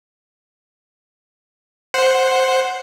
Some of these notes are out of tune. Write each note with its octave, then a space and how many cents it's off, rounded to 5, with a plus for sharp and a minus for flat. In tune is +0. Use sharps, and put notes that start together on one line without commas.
C5 +0 F#5 +0